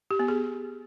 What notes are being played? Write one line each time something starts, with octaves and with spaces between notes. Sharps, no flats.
G4
B3
G#4